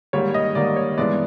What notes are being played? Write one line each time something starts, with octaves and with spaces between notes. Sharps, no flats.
G#2 D#3 G3 A#3 C#5
D#5
G#2 D#3 G3 A#3 D5
C#5
G2 E3 G#3 B3 D5